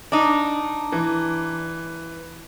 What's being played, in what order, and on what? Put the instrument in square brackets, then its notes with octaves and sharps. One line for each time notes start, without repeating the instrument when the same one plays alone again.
[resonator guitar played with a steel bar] D4 D#4
[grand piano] E3